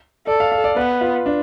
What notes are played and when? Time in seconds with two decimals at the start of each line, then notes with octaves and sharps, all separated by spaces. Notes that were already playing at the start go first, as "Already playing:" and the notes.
0.27 A4 D5
0.40 F5
0.52 F5
0.64 D5
0.76 B3 B4
1.01 F4
1.26 D4